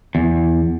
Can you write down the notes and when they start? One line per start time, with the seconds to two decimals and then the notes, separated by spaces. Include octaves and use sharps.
0.15 E2